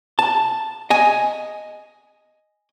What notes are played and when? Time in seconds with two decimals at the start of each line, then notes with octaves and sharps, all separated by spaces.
0.19 A5
0.90 D#5 G#5